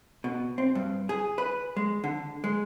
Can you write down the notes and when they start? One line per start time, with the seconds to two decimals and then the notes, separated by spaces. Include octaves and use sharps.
0.24 B2
0.58 C4
0.75 G2
1.09 G#4
1.38 B4
1.77 G#3
2.04 D3
2.44 G#3